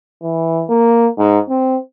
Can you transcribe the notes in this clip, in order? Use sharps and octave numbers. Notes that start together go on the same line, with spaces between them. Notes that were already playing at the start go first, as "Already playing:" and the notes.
E3
A#3
G#2
C4